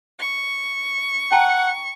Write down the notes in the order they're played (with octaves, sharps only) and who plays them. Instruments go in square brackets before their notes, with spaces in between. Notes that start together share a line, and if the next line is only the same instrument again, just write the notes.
[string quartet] C#6
[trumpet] F#5 [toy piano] G5 A5 A#5